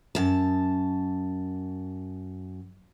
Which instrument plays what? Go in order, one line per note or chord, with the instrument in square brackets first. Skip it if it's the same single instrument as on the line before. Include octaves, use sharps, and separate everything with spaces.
[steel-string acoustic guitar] F#2 A5